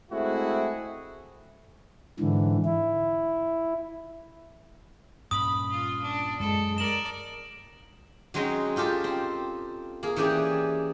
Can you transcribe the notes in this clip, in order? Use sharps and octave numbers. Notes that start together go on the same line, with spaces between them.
G#3 A3 C4 E4 F#4 G#4
G#2 D3 E3
E4
G2 A#2 C#4 B5 D#6
F4
D4
F#2 G#3 A4
A#4 D5 E7 F#7
F#3 G#3 C4 C#4 D#4 D#5
C#4 F4 G4 A4
C4
A#3 G#4
E3 C#4 G4 G#4 D5